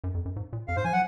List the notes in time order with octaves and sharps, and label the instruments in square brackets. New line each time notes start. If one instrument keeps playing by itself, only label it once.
[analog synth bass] F#2
F2
F#2
G#2
A#2
[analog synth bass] F2 [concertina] F5
[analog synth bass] G#2 [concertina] C5
[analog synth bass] F3 [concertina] G#5
[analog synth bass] F#3 [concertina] F#5